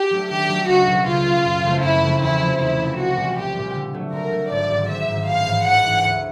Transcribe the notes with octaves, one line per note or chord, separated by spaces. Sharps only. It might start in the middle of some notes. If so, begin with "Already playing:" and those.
Already playing: G4
F#3 A3 D4
D#3 G4
F#3 A3 D4
C#2 F#4
B2 F#3
C#2 F4
B2 F#3
F#2
C#3 F3 A3 C4
F#2 E4
C#3 F3 A3 C4
E2 E4
C3 F3
E2 E4
C3 F3
C2 F#4
A#2 G3
C2 G4
A#2 G3
D3
F#3 A3
D3 A#4
F#3 A3
G#1 D5
G#2 D#3
G#1 E5
G#2 D#3
A1 F5
G#2 E3
A1 F#5
G#2 E3
D2